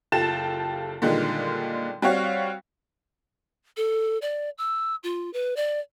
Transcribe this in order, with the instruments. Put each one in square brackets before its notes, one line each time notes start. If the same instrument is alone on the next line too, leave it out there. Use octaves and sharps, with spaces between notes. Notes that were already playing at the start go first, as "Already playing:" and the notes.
[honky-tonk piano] F#1 F4 G4 A4 A6 E7
A#2 D3 D#3 G3 G#3
G3 C4 F#4 C#5 F5
[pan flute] A4
D5
E6
F4
B4
D5